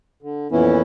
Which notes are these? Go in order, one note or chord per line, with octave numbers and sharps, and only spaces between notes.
D3
F2 A#2 E3 B3 C#4 E4